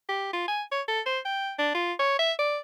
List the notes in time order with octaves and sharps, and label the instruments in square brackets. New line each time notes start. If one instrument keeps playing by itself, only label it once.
[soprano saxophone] G4
F4
G#5
C#5
A4
C5
G5
D4
F4
C#5
E5
D5